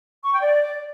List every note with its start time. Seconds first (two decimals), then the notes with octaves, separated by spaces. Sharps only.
0.24 C#6
0.33 G5
0.42 D5